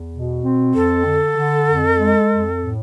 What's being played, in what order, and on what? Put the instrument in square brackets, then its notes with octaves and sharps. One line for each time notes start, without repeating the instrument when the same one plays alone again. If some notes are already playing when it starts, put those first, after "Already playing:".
Already playing: [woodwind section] E2
B2
C4
[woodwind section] F2 [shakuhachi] A4
[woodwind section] D3
D3
F2
G#3
F2
A2